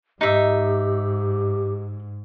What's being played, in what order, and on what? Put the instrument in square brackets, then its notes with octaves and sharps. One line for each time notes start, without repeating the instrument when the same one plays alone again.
[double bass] G#2 [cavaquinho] D#4 E5 [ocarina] G4